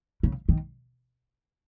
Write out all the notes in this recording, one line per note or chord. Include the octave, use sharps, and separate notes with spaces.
C#3
D#3